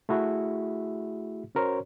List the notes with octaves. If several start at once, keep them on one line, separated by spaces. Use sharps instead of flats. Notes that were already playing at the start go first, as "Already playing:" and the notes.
A3 E4 F#4 G#4 E5
C#4 F#4 A#4 C5 C#5